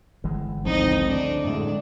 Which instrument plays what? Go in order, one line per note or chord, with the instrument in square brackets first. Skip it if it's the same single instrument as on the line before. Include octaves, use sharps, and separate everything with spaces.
[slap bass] G1 E3 G#3
[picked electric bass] C#2 A2 F3 [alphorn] C4 [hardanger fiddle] D#4 D#5
[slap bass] D3 [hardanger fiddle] D4
[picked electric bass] F#2 A2 G#3 [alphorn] A3 [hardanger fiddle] D4